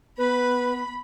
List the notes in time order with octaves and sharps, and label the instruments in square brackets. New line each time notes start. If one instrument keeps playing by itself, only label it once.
[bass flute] B3 [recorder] B4 [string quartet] B5